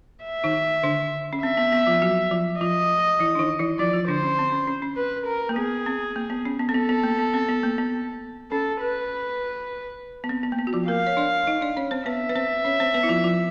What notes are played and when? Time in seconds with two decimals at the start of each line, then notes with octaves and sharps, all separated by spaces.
0.25 E5
0.44 D#3 D#4
0.83 D3 D4
1.33 C#4
1.43 C4 E5
1.57 B3
1.72 B3
1.87 F3 F4
2.02 F#3 F#4
2.31 F3 F4
2.61 F3 F4 D#5
3.19 E3 E4
3.35 D4
3.39 D#3 D#4
3.59 E3 E4
3.79 F3 F4 D5
3.93 F3 F4
4.08 D3 D4 C5
4.23 C#4
4.39 C4
4.52 C#4
4.67 C#4
4.82 C#4
4.97 B4
5.27 A#4
5.49 A#3
5.56 B3 G#4
5.86 C4
6.16 A#3
6.30 B3
6.45 C#4
6.59 B3
6.69 C4
6.74 B3 A4
6.89 B3
7.04 A#3
7.19 B3
7.34 C4
7.48 B3
7.63 A#3
7.78 B3
8.51 C#4 A4
8.81 B4
10.24 B3
10.29 C4
10.43 B3
10.52 A#3
10.58 B3
10.67 F#4
10.73 F3 F4
10.88 A#3 A#4 F5
11.07 C#5
11.17 D4 D5
11.47 D#4 D#5
11.61 D4 D5
11.77 C#4 C#5
11.91 C4 C5
12.06 B3 B4 E5
12.29 B4
12.36 C4 C5
12.65 C#4 C#5
12.80 C4 C5
12.94 B3 B4
13.03 E4
13.09 F3 F4
13.24 F3 F4